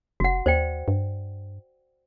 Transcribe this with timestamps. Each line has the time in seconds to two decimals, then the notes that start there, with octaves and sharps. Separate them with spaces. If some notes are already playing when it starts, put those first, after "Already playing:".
0.20 F1 F#4 F#5
0.46 D#2 C5 D5 G5
0.88 G2